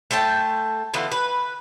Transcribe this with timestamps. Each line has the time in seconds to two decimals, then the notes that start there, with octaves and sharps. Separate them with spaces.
0.11 A3 C5 G5 A5
0.94 D3 E3 B3 F4
1.12 B4